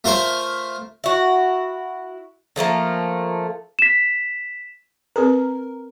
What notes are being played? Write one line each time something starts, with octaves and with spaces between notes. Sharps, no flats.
A3 F4 A#4 C5
E4 F#4
D3 F3 A3 A#3
B6 E7
C4 G#4 A#4 B4